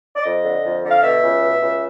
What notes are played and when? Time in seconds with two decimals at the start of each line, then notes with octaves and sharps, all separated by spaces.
0.15 D5
0.23 F2 D#5
0.43 D3
0.63 F2
0.83 D3
0.90 F5
1.02 B2 E5
1.22 C#2
1.41 B2
1.61 C#2